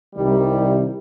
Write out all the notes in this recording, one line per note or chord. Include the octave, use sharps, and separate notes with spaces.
C2 C3 D#3 G3